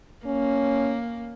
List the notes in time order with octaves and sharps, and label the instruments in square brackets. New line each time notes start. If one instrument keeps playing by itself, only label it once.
[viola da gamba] A#3 [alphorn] C#4